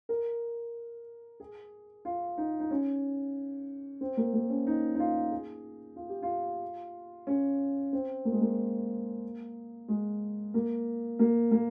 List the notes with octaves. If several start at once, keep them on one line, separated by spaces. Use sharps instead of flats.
A#4
G#4
F4
D#4
D#4
C#4
C4
A#3
A#3
C#4
D#4
D#4
F4
G#4
F4
G4
F4
C#4
C4
A#3
G#3
A#3
G#3
A#3
A#3
A#3